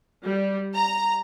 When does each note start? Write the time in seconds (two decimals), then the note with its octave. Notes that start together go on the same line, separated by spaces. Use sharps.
0.23 G3
0.74 A#5